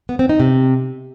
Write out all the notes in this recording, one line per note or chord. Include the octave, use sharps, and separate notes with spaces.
B3
C4
D#4
C3